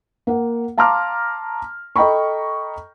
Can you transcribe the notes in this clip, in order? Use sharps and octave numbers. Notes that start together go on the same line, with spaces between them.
A#3 F#5
F5 A5 A#5 C6 D6 F6
A4 D#5 G5 A#5 B5 C#6